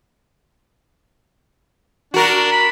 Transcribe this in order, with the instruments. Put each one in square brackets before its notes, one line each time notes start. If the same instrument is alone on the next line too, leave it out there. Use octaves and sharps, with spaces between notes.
[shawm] D4 [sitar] F#4 A#4
[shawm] B5